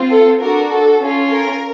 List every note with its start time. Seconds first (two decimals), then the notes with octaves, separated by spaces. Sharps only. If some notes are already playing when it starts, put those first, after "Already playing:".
Already playing: C4 F4
0.11 A4
0.40 D4 F#4 A4 A#4
0.71 A4
1.01 C#4 F4 A4
1.31 A#4